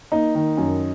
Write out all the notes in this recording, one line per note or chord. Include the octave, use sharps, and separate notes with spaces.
A#3 D#4
D#3
F#2